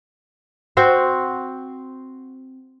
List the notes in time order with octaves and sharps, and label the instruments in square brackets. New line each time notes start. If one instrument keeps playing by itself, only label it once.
[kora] C4 F#4 C5